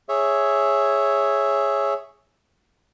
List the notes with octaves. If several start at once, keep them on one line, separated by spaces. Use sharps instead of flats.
G#4 C#5 E5